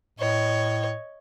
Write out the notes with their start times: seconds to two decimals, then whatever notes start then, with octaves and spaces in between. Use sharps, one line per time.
0.19 A2 C#5 D#5